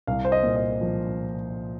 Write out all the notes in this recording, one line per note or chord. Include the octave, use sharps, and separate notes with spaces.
C2 F5
C5
D#5
A#2
D#5
F3